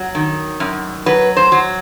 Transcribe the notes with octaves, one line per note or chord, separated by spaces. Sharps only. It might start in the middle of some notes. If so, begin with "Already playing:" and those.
Already playing: F#3
D#3
F#2
F#3 B4
C5
F#3